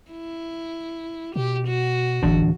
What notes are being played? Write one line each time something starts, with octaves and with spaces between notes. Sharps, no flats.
E4
B2 G4
F#4
D1 G1 E3 D4